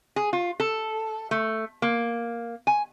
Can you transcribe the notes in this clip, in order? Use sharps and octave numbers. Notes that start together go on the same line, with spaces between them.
G#4
F4
A4
A3
A#3
G#5